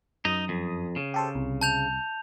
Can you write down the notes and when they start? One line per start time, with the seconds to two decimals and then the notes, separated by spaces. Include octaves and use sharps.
0.25 F#2 D#4 D#6
0.49 F2
0.96 C#3
1.14 G4 A4 C5
1.35 C2
1.61 A5 G6 F7